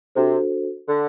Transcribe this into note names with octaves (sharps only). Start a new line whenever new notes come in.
C3 D4 F#4 A4 C5
D3